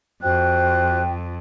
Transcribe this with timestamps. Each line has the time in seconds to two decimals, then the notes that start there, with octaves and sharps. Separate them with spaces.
0.23 F2 F#4 C5 G5 F#6